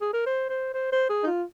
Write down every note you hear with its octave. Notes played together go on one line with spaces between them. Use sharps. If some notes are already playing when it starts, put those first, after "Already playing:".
G#4
A#4
C5
C5
C5
C5
G#4
D#4
F4